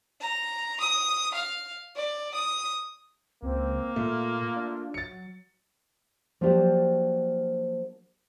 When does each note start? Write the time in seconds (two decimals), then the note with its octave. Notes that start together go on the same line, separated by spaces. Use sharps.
0.21 A#5
0.80 D#6
1.34 F5
1.96 D5
2.34 D#6
3.42 C#2 A#3 C4
3.96 A#2 A3 F4
4.56 D4
4.94 F#3 A6 C#7
6.41 F3 F#3 A#3 D4 G4 C5